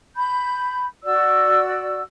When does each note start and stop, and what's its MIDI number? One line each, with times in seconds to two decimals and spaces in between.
0.16 0.84 83
0.16 0.84 91
1.03 2.01 66
1.03 2.01 74
1.03 2.01 88